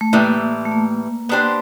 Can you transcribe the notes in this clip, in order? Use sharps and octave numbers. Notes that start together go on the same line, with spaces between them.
A3
A2 E3 G3 A#3
A3
A#3
B3 D4 G4 C5